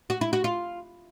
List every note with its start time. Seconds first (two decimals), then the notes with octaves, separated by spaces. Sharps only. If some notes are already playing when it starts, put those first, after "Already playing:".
0.10 F#4
0.21 E4
0.33 F#4
0.44 F4